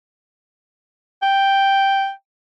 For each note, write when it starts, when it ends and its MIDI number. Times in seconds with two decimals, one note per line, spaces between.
1.22 2.11 79